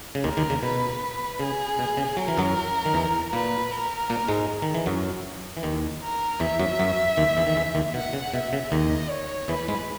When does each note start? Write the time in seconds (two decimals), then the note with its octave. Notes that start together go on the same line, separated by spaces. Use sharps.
0.15 C#3
0.24 D#2 D#3 A#4
0.37 D#2 D#3
0.50 C#3
0.63 B2 B4
1.40 C#3 G#4
1.79 B2
1.97 C#3
2.17 F#3 A#4
2.28 E3
2.38 F#2 F#3
2.86 D#3
2.94 E2 E3
3.33 A#2 A#3 B4
3.71 A#4
4.10 A#2 A#3
4.28 G#2 G#3
4.62 D#3
4.74 E3
4.86 F#2 F#3
5.57 E3
5.63 D#2 D#3
6.02 A#4
6.40 E2 E3 E5
6.60 F#2 F#3
6.79 F#2 F#3
7.17 D#2 D#3
7.37 E2 E3
7.47 D#3
7.56 E2 E3
7.75 D#2 D#3
7.94 B2 F#5
8.13 C#3
8.33 B2 E5
8.53 C#3
8.72 D#2 D#3 D#5
9.10 C#5
9.48 E2 E3 B4
9.68 G#2 G#3